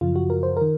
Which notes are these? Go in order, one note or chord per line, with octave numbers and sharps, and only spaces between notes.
F#2 C#3 F3 F4
F#4
A#4
C5
D#3 A#4